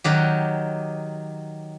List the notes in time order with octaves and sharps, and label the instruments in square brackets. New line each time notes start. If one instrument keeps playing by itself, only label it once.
[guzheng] D#3 F#3 G4